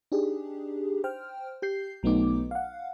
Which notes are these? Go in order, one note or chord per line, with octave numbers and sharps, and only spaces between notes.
D4 D#4 G4 G#4
C5 G5 F6
G4 G6 C7
B1 F#3 A3 B3 D#4 D6
F5 F#5